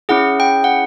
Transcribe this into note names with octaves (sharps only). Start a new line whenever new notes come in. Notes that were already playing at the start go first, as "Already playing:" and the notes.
C#4 E4 G#4 F#5
G5
F#5